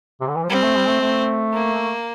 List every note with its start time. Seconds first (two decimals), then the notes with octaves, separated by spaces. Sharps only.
0.21 C3
0.28 D3
0.36 E3
0.43 F3
0.49 G3 C4
0.63 A3
0.76 G3
0.88 A3
1.01 A3
1.53 A#3